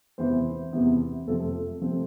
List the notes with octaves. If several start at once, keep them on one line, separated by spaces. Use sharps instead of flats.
E2 C3 E3 B3 C5
E2 C3 E3 B3
F2 C3 F3 A3 C4 A4
C3 F3 A3 C4